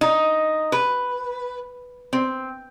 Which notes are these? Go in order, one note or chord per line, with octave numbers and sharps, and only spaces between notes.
D#4
B4
C4